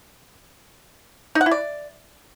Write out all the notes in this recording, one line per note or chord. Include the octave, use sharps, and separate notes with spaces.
D#4
F#5
E4
D5